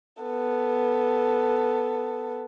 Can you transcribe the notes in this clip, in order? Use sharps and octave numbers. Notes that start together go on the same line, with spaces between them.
B3 A4